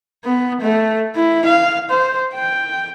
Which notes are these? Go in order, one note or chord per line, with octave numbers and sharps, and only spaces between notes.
B3
A3
E4
F5
C5
G5